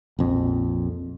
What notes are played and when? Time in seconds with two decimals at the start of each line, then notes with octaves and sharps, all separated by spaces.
0.19 A#1 F2